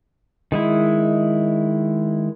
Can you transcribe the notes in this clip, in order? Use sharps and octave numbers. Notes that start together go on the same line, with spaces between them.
D#3 G#3 E4